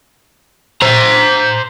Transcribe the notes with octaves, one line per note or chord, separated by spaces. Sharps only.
C5 A#5